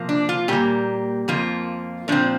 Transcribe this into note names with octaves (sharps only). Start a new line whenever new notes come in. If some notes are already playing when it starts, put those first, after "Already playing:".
Already playing: C3 F3 A#3
D4
F4
A#2 G3 A#3 G4
F2 F3 A#3 F4
A#2 F3 C4 D4